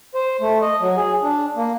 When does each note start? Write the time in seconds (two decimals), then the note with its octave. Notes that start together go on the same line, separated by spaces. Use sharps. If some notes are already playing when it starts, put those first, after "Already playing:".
0.15 C5
0.41 A3
0.62 D#5
0.80 F#3
0.96 G#4
1.22 D4
1.56 A#3